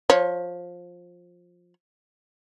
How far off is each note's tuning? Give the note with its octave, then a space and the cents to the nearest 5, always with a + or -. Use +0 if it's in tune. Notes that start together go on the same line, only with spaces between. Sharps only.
F3 +15 C#5 +0